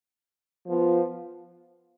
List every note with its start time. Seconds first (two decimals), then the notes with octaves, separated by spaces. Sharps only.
0.66 F3 B3 F4